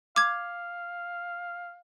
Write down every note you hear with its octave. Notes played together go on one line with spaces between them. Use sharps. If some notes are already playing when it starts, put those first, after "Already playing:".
F5 D6 G#6